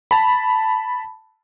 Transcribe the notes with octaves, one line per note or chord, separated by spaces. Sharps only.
A5 B5